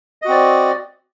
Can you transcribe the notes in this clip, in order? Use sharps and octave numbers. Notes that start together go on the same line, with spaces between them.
C4 F#4 D5 D#5